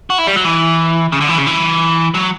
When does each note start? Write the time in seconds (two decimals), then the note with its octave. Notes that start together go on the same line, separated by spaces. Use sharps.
0.10 F#4
0.18 E4
0.27 G3
0.36 F#3
0.44 E3
1.12 C#3
1.21 D3
1.29 E3
1.38 C#3
1.46 E3
2.14 F#3